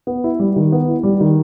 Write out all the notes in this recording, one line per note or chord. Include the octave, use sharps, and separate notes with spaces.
B3
E4
G3
D#3
B3
E4
G3
D#3